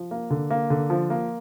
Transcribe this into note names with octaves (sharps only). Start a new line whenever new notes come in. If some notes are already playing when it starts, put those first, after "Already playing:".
Already playing: F3
A#3
D3
A#3
D3
F3
A#3